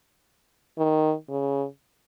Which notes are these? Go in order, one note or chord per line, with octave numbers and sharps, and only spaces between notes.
D#3
C#3